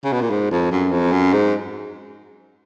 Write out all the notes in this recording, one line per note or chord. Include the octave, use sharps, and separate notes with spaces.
C#3
B2
A#2
G#2
F2
F#2
F2
F#2
G#2